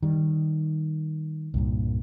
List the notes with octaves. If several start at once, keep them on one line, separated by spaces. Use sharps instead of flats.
D#3 G3
C2 G2 A#2